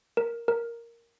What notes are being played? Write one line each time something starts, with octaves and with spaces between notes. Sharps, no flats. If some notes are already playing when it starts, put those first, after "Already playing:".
A#4
A#4